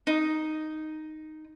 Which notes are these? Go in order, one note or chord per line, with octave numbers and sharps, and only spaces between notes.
D#4